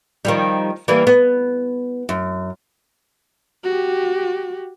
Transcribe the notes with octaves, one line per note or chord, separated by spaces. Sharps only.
D#3 F3 G3
E3 G3 A#3
B3
F#2
F#4 G4